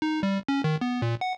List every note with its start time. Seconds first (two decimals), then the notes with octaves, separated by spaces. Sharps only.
0.02 D#4
0.23 G3
0.48 C#4
0.64 D#3
0.81 B3
1.02 A#2
1.21 F#5